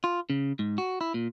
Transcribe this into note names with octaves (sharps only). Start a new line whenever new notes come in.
F4
C#3
G#2
F#4
E4
A#2